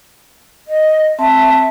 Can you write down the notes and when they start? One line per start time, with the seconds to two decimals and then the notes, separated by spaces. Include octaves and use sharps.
0.68 D#5
1.19 C4 E5 A5